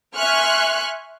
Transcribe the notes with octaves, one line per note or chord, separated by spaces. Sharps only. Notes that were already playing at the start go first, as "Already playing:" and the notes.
E5 G#5 C6 C#6 F6 F#6